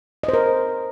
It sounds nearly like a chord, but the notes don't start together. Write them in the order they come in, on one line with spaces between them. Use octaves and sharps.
D#5 C5 A#4